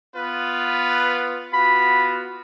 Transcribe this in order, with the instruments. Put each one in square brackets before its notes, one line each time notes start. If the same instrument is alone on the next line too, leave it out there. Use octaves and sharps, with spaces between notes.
[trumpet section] B3 F4 B4
[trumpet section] B3 F4 F#4 [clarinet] B5